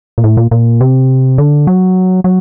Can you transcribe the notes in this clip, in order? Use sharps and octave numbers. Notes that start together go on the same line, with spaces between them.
A#2
A2
A#2
A#2
C3
D3
F#3
F#3